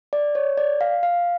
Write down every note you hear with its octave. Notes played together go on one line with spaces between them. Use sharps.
D5
C#5
D5
F5
F5